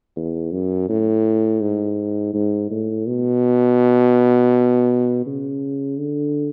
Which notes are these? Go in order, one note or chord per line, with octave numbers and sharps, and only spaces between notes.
E2
F#2
A2
G#2
G#2
A2
B2
C#3
D3